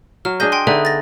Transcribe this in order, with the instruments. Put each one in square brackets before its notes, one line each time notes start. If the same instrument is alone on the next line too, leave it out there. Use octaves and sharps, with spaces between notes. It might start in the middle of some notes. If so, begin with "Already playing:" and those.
[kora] F#3 [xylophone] F6
[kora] D4 G#4 D#5 [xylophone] G6 A#6 D#7
[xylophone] G5 G#5 C6
[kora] D3 B3 D#4 [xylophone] G#4 E5 G#5
[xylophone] A6 A#6